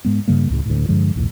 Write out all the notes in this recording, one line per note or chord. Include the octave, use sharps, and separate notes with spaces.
G#2 G#3 B3
G2 C#3 G3 A#3
C#2 A2 C#3
D2 A2
G2 D3 F3 G#3
B1 E2 A2